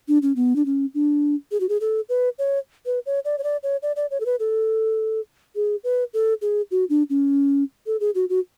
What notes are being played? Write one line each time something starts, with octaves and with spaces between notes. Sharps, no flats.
D4
C#4
B3
D4
C#4
D4
G#4
F#4
G#4
A4
B4
C#5
B4
C#5
D5
C#5
D5
C#5
D5
D5
C#5
A4
B4
A4
G#4
B4
A4
G#4
F#4
D4
C#4
A4
G#4
F#4
F#4